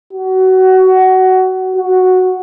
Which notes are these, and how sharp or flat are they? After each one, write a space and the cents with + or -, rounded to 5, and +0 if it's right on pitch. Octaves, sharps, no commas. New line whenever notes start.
F#4 +20
F#4 +0